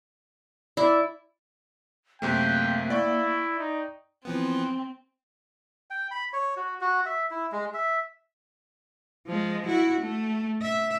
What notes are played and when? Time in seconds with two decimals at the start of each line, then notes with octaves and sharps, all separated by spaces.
0.77 E4 D5
2.22 F#2 C3 A3 A#3 G5
2.90 E4 D5 G5 C#6
3.59 D#4
4.25 E3 F3 B3 C4
5.90 G5
6.11 B5
6.33 C#5
6.57 F#4
6.81 F#4
7.06 E5
7.31 E4
7.52 G#3
7.74 E5
9.27 F3 G#3
9.66 E4 F#4
10.01 A3
10.62 E5